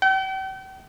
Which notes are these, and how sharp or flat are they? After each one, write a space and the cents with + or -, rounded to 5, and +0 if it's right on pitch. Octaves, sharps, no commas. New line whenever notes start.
G5 -40